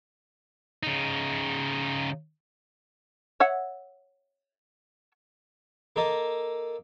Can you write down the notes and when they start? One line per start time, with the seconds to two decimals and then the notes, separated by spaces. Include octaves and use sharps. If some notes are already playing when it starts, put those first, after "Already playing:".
0.83 C#3 D#4
3.40 C#5 E5 F#5
5.96 A#3 A4 D#5